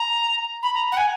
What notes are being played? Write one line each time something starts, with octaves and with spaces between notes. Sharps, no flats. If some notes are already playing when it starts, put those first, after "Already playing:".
Already playing: A#5
B5
A#5
F#5
G#5